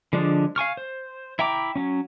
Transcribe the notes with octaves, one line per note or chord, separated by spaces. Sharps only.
D3 F3 G#3 D4
F5 G#5 C#6 F6
C5
E4 E5 G5 A#5 D6
F#3 C#4